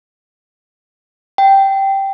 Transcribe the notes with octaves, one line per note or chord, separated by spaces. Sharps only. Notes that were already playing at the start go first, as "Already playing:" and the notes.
G5